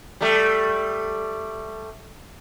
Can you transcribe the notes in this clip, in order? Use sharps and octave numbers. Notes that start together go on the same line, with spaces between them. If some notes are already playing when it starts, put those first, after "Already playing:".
G3 A3